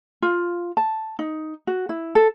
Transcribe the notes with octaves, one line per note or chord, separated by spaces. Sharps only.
F4
A5
D#4
F#4
E4
A4